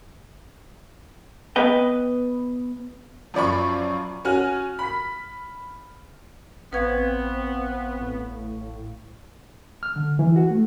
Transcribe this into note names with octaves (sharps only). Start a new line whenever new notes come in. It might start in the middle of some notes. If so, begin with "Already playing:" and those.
B3 B4 D#5 G5
F#2 F3 D5 B5 C#6
C#4 F#4 G#5 F6
B5 B6
A1 B3 C4 B4 F5 C#6 G#6
A2
F6
D3
E3
F#4
A3